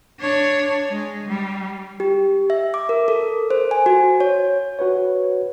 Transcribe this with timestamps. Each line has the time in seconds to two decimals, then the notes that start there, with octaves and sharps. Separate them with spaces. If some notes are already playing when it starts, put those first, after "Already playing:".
0.20 D4 C#5
0.90 G#3
1.28 G3
2.00 G4
2.50 E5
2.74 D6
2.89 A#4
3.08 A4
3.50 C5
3.71 G#5
3.86 F#4
4.20 C#5
4.79 F#4 B4 C#5